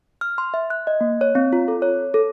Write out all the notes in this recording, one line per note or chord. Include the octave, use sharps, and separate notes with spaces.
F6
C6
E5
F#6
D#5
A#3
C#5
C4
F4
A4
C#5
A4